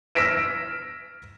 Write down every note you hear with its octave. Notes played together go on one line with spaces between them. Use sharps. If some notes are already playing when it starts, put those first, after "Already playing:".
E6 F6 A#6 B6 D7 E7